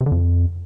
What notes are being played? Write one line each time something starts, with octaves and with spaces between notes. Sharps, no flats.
C3
D3
F2